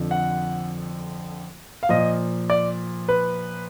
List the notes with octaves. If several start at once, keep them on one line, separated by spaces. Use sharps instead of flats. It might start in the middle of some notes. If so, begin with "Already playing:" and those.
Already playing: F2 D3 F3
F#5
F5
A#2 F3 D#5
D5
B4